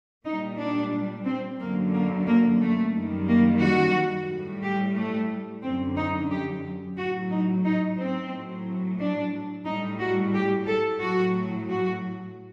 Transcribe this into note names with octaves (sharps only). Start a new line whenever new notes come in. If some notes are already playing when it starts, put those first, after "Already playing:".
A#2 G3 D#4
D4
C4
F#2 D3 F#3 A#3
A#3
A#3
A3
F#2 D#3 G3
A#3
F#4
A2 G3
G4
A3
F#2 D3 F#3 C4
D#4
G4
A2 F#3 F#4
D#4
D#4
C4
A2 F#3
D4
A2 G3 D#4
F#4
G4
A4
A2 F#3 F#4
F#4